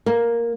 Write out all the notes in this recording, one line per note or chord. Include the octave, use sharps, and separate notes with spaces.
A#3